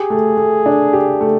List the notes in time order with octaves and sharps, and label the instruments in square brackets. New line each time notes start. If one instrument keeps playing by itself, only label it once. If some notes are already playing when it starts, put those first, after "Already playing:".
Already playing: [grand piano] G4 [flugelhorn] G#4
[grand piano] A3
A3
D4
G4
A3